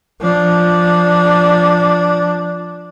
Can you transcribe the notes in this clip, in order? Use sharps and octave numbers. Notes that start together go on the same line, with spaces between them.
F3 D4